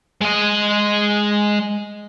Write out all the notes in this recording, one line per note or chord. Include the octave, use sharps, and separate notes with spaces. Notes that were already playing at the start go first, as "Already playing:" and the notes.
G#3 D#5